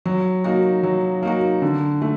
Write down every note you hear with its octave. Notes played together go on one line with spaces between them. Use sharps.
F#3
A#3 D#4 F#4
F#3
A#3 D#4 F#4
D3
A3